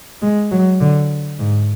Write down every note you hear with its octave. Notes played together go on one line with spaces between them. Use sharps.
G#3
F#3
D3
G#2